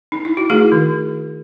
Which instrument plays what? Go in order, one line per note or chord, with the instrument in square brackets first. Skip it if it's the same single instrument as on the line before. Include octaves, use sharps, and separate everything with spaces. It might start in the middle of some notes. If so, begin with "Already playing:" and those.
[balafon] D#4
E4
F#4
A3 E4 G#4
D#3